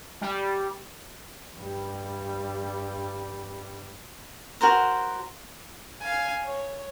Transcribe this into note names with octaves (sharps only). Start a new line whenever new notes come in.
G3
G2 G3
F#4 A#4 C5 A#5
F5 G#5
C#5